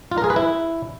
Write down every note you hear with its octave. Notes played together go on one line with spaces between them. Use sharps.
F4
A#4
G#4
B4
E4